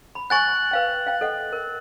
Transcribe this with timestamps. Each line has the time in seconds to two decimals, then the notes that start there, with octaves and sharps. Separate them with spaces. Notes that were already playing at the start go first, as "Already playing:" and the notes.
0.15 B5
0.30 F#5 G#5 C#6 F#6 A6 F#7
0.71 B4 F5 G5
1.07 F5 G5
1.21 A4 D#5 F#5
1.53 A#4